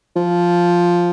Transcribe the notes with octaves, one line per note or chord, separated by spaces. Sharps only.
F3